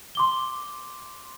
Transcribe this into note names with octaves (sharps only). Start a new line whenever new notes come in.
C6 D6 G7